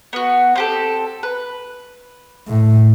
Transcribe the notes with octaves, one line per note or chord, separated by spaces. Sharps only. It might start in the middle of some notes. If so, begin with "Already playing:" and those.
B3 F#4
C4 G4 A4
B4
A2